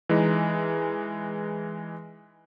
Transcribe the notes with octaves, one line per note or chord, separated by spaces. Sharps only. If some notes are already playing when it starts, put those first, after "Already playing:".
E3 G#3 D#4